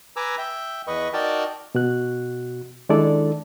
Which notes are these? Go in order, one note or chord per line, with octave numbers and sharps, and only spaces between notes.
B4 G#5 A#5 D6 E6
E5 G5
E2 B4 D#5 C#6
D#4 F#4 A#4 D5 G5 A5
B2 F#4 F#6
D#3 G#3 D4 E4 A4 D5